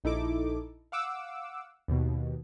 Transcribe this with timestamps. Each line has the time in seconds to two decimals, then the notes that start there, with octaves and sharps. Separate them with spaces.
0.04 A#1 D#4 E4 A4 D6
0.92 F5 F#5 D6 E6
1.88 D#2 B2